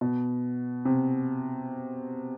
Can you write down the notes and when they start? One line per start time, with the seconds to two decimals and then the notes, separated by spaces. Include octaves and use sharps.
0.01 B2
0.85 C3